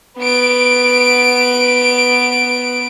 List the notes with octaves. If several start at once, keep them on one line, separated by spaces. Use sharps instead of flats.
B3 D7